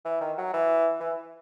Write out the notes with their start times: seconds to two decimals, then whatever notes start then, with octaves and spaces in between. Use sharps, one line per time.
0.05 E3
0.21 D#3
0.38 F#3
0.54 E3
1.00 E3